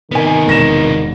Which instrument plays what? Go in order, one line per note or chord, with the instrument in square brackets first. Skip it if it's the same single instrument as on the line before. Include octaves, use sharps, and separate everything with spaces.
[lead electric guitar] C3 B3 [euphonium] D#3 [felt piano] A#4 G#5
[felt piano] E1 A#6 E7